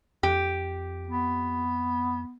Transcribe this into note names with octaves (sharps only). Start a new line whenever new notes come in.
F2 G4
B3